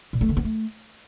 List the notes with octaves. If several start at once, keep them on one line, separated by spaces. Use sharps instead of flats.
A#2
A3
D3
B3
A3